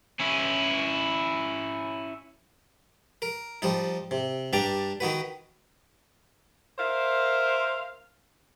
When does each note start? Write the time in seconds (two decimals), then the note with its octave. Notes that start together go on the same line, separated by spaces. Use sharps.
0.20 C#4 E4
3.22 A#4
3.62 F3 G3 D#4
4.11 C3
4.53 G2 D4 G4 G5 A#5
5.00 D#3 D#4 F#4 B4
6.79 A#4 C5 E5 F5